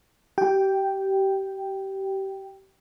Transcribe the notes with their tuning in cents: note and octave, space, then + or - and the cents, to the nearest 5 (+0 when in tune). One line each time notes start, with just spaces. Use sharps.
G4 -25 G5 +0